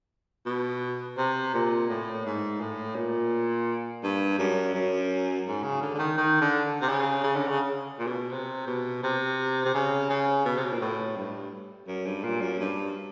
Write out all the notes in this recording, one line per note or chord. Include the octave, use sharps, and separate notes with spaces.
B2
C3
A#2
A2
G#2
A2
A#2
G2
F#2
F#2
G#2
C#3
D3
D3
D#3
D#3
D3
C3
C#3
C#3
D3
C#3
A#2
B2
C3
B2
C3
C3
C#3
C#3
B2
C3
B2
A#2
A2
G2
F#2
G2
A#2
F#2
G2